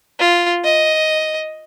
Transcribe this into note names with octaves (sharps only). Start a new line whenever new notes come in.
F4
D#5